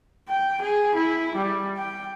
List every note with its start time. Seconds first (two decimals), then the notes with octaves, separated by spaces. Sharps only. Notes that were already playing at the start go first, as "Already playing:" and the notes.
0.29 G5
0.62 G#4
0.95 E4
1.35 G3
1.77 G5